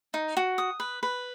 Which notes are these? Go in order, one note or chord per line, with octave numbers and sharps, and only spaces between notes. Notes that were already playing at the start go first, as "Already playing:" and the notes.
D#4
F#4
D#6
B4
B4